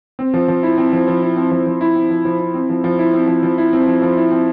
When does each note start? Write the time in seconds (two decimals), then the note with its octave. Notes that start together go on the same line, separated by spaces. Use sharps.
0.19 C4
0.34 F3
0.48 F3
0.63 E4
0.78 C4
0.93 F3
1.08 F3
1.22 E4
1.37 C4
1.51 F3
1.67 F3
1.81 E4
1.96 C4
2.10 F3
2.25 F3
2.39 E4
2.54 C4
2.70 F3
2.84 F3
2.99 E4
3.13 C4
3.28 F3
3.43 F3
3.58 E4
3.73 C4
3.87 F3
4.02 F3
4.17 E4
4.31 C4